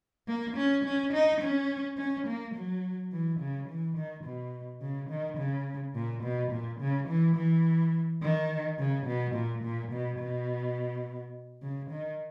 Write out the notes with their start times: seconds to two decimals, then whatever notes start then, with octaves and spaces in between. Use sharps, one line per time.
0.28 A#3
0.57 C#4
0.85 C#4
1.13 D#4
1.41 C#4
1.98 C#4
2.27 A#3
2.55 F#3
3.12 E3
3.40 C#3
3.69 E3
3.97 D#3
4.24 B2
4.82 C#3
5.10 D#3
5.38 C#3
5.95 A#2
6.23 B2
6.51 A#2
6.80 C#3
7.09 E3
7.36 E3
8.22 D#3
8.79 C#3
9.07 B2
9.35 A#2
9.64 A#2
9.92 B2
10.20 B2
11.62 C#3
11.90 D#3